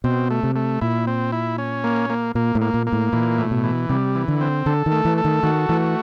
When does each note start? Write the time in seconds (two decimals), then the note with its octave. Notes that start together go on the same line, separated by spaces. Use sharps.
0.04 B2 C4
0.30 A3
0.43 C3
0.56 A3
0.81 A#2 E4
1.07 C4
1.32 E4
1.58 C#4
1.84 A#3
2.10 A#3
2.35 A#2 A#3
2.55 A2
2.61 A#3
2.74 A#2
2.87 A#3
2.93 A2
3.12 A#2 E3
3.38 A2
3.51 B2
3.64 E3
3.89 C3 G3
4.15 E3
4.28 D3
4.41 C4
4.66 D3 A4
4.86 D#3
4.92 A3
5.05 E3
5.18 A4
5.25 D#3
5.43 D#3 F#4
5.69 E3 A3